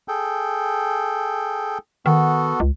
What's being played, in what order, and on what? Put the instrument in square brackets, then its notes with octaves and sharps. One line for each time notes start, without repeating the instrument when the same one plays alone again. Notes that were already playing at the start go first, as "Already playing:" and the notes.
[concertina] G#4 A4 G5
[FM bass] D#3 [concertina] B3 F#4 A4
[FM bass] C#2